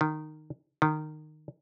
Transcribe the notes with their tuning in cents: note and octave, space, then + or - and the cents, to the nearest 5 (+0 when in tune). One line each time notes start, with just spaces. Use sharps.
D#3 -15
D#3 -20